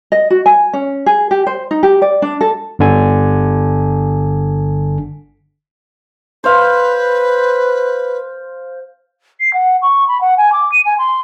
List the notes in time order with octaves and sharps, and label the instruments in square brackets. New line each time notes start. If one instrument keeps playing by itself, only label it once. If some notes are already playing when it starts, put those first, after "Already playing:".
[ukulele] D#5
F#4
G#5
C#4
G#4
G4
C5
D#4
G4
D5
D4
A4
[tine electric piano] G1 D3 G#5
[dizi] B4 [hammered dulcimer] C5 F5
[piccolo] C7
F#5
C#6
B5
F#5
G#5
D6
D#7
G#5
C6